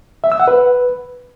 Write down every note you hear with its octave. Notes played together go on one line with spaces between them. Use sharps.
E5
E6
F#5
B4